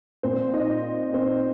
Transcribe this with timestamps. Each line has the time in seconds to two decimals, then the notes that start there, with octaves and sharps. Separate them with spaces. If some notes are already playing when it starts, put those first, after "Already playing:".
0.23 A#2 F3 C4 C5
0.53 D#4 D#5
1.13 C4 C5